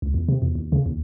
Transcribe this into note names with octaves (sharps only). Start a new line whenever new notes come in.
C#2
E2
C3
E2
D#2
C#3
D#2